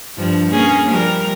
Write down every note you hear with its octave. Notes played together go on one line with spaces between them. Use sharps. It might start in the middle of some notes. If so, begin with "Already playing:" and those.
G2 F3
A#3 C#4 G#4
F3 G3 A#4